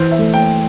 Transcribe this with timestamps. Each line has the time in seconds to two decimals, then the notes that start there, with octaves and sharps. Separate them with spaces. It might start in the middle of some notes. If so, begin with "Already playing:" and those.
Already playing: E3 C5
0.11 E5
0.19 A3
0.34 G5